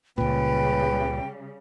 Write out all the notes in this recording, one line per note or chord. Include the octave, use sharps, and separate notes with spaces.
C#2 A#2 C#3 G3 B4 G5